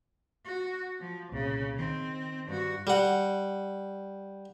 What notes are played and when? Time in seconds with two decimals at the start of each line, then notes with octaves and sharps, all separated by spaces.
0.45 F#4
1.00 F3
1.32 C2 A#2 C#3
1.78 D#3 C4
2.47 G2 F#4
2.87 G3 F#5